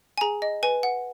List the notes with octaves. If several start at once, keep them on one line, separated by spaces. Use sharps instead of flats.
G#5
G#4 A#5
D#5
B4 G#5
F#5